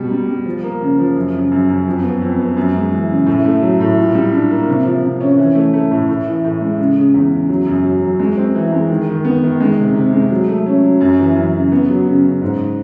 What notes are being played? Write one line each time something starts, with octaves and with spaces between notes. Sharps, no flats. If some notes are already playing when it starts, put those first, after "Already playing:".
Already playing: B2 G3
G3
G3
F3
A#3
C#3
F3
F#2
C#3
F#2
F#2
F2
B3
F2
B3
F#2
G#3
E3
C#3
A2
A3
F#3
A2
A#2
G3
D4
A#3
C3
F3
C3
C#4
E3
A3
A3
A2
A2
E3
A2
G#3
C#3
C#3
E2
C#3
F#3
F#2
F#3
F#3
G#3
C4
E3
G#3
D#3
D#3
B3
D#3
G#3
C3
C3
G#3
F#3
A3
C#4
F#3
F#2
E3
F#2
C#3
B3
F#3
C#3
C#3
G#2